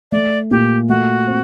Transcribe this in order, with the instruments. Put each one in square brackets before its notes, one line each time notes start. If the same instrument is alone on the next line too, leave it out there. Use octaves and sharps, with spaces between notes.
[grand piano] A3 [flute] D5
[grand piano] A#2 [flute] G4
[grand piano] A3 [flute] F#4
[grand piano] C4